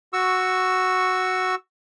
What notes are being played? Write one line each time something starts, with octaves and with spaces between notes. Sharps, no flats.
F#4 C#6 E6